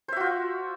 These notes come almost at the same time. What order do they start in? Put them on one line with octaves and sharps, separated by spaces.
C5 E5 F#4 F4